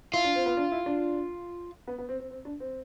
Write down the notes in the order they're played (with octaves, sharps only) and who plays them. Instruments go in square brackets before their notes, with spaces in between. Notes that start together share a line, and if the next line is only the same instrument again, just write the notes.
[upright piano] E4 [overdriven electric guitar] F4
[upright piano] D4
C4
B3
D4
E4
D4
B3
B3
C4
C4
C4
D4
C4